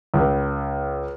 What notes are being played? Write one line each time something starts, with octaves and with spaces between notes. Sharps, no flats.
C#2